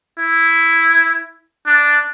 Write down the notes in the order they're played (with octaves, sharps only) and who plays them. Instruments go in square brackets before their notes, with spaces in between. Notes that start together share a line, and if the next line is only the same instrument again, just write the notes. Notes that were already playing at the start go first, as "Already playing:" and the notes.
[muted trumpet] E4
D4